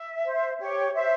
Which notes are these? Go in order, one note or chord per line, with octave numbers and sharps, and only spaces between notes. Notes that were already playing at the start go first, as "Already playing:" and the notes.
Already playing: E5
C5
G4 C#5
C5 E5